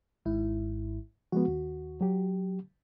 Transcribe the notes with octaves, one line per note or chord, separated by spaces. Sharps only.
G#1 G#2 E4
F3 G#3 B3 F#4
D#2
F#3 G4